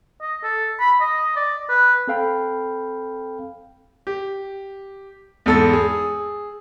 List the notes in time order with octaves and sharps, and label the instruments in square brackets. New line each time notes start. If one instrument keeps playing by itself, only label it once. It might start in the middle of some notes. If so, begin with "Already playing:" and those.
[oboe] D#5
A4
B5
D#5
D5
B4
[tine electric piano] C4 A4 F5 G5 B5
[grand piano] G4
E2 G#2 A4 E6 A6
G#4